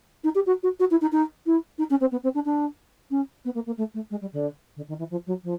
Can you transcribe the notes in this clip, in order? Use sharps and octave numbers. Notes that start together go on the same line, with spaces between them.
D#4
G4
F#4
F#4
F#4
E4
D#4
D#4
E4
D#4
C#4
C4
B3
C4
D4
D4
C#4
B3
A#3
A#3
A3
A3
G#3
G3
D3
D3
D#3
E3
F3
F#3
F3